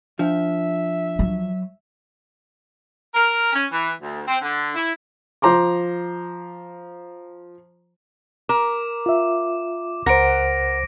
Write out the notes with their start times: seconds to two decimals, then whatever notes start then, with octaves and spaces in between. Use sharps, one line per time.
0.19 F3 D4 E5
1.19 F#3
3.14 A#4
3.53 C#4
3.71 E3
4.00 D2
4.28 C4
4.41 D3
4.75 E4
5.42 F3 C5 A#5 C6 D6
8.49 A#4 D6
9.06 F4 E5
10.06 C#2 A#4 C5 F#5 A#6 D7